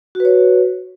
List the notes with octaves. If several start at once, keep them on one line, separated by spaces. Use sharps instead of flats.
F#4 B4 C#5